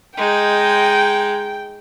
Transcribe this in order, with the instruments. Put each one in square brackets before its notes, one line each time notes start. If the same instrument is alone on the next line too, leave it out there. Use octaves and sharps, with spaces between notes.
[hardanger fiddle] G#3 D#4 [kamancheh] G5